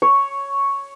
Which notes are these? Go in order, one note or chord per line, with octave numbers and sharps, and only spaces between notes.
C#5